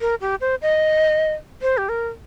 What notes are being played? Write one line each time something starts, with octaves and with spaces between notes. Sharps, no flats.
A#4
G4
C5
D#5
C5
G4
A#4